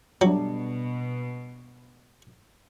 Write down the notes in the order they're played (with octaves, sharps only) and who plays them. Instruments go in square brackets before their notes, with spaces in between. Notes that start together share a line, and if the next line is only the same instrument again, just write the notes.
[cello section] B2 [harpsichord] F#3 [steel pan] G3 D4